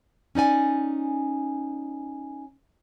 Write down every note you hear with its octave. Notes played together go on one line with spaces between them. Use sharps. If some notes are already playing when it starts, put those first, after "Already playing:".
C#4 D#4 D5 G#5